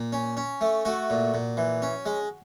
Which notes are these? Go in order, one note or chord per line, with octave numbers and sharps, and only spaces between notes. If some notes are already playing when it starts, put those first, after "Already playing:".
Already playing: A#2
C#4
C#4
A3
A3 F#4
A#2
A#2
E3
C#4
G#3